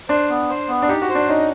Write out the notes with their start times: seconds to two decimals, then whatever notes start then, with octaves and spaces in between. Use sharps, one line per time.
0.09 D4 C5
0.30 B3
0.49 C5
0.68 B3
0.82 D4
0.88 D#4 G4
1.02 F#4
1.09 C5
1.15 D4
1.28 C#4 D#4